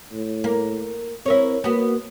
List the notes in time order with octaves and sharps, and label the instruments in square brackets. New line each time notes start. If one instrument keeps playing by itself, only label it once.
[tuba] A2
[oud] A#3
[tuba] C4 [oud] E4 A#4 C#5
[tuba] A#3 [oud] B3 F#4